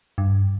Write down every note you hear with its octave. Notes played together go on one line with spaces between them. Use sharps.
G2